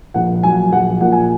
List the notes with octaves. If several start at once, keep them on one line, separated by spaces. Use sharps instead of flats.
A#1 F#5
F#3 G#5
A#1 F#5
A#2 F#5
G#5